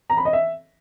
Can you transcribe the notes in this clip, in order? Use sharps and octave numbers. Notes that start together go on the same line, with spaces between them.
A#5
B5
D#5
E5